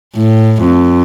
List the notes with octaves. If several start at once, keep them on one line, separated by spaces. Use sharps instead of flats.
A2
F2